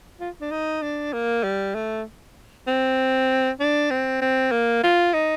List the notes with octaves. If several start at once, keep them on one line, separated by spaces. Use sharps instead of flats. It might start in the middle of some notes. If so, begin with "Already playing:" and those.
F4
D4
D#4
D4
A#3
G3
A3
C4
D4
C4
C4
A#3
F4
D#4